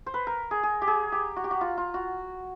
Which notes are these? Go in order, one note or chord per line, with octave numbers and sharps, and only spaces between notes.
C5
B4
A#4
G#4
G#4
G4
G#4
G4
F#4
G4
F#4
F4
F4
F#4